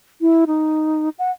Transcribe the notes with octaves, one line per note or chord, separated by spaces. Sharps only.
E4
D#4
F#5